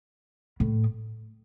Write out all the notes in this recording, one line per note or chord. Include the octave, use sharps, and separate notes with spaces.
A2